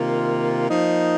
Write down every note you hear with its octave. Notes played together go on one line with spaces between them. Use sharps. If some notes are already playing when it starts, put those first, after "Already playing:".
Already playing: C3 D#3 A#3 F4
F3 A#3 D#4